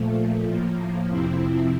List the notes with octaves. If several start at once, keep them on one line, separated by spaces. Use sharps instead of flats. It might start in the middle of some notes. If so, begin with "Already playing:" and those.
Already playing: A#2 F3 A3
A2 F3 A#3
F2 C3 F3 C4 E4